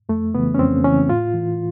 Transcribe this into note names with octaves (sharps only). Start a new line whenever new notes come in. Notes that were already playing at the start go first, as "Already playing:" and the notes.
F2 A3
C#3 E3 B3
C#4
F2 C4
C#3 E3 C#4
A2 F4
E3